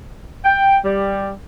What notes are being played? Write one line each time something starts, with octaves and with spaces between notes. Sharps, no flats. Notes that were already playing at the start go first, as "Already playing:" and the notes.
G5
G3